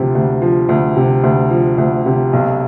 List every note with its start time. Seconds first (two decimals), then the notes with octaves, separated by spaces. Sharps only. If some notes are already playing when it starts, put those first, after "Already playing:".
Already playing: D2 C3 F3
0.15 D2
0.42 F3
0.69 D2
0.97 C3
1.23 D2
1.51 F3
1.78 D2
2.06 C3
2.33 B1